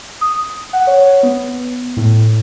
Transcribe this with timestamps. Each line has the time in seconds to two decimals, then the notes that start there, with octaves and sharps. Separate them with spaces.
0.21 D#6
0.73 F#5
0.87 C#5
1.23 B3
1.97 A2